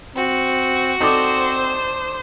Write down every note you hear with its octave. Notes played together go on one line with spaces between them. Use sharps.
C4 F#4
C4 D#4 A4 C5 D5